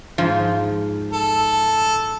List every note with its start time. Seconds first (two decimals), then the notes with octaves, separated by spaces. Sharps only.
0.18 G#2 F3 F4
1.13 A4